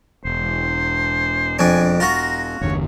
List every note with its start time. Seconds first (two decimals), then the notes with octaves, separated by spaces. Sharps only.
0.25 E1 C5
1.59 F2 D4 G#5
2.00 F4 F#4 A#5
2.61 G1 E2 D3 C#5